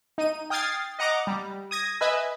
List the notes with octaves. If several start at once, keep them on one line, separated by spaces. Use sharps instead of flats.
D#4 D#7
G5 D#6 F6 G#6 A6 C7
D#5 F#5 A#5 D6 D#6
G3
D#6 G#6 A#6
B4 D#5 E5 G#5